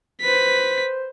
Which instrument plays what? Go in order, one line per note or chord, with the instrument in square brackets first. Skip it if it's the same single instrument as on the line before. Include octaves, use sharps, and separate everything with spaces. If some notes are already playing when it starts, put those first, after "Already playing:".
[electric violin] B4 B6 [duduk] C5